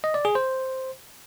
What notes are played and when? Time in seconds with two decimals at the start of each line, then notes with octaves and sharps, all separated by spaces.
0.04 D#5
0.14 D5
0.25 G#4
0.35 C5